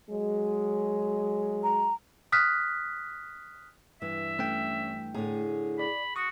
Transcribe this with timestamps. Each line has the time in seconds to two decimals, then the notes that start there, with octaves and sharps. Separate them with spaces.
0.10 F#3 G#3
1.63 A#5
2.32 D#6 F6 F#6 B6
4.02 G2 E3 E5
4.39 A3 C#4 G5
5.14 A2 D3 G#4
5.79 D5 B5
6.16 F#4 C#6 D#6